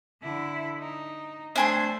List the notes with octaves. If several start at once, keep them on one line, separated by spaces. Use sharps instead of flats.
D3 E4
D#4
A3 D4 C5 G#5 C6